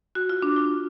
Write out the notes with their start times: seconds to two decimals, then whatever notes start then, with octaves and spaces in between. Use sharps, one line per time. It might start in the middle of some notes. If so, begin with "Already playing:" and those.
0.15 F#4
0.29 F4
0.42 D4
0.56 F4